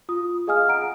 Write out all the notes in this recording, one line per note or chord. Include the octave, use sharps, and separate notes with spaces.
F4 D#6
G#4 D#5 F5 G#5 D#6 F6
F#5 A#5 D7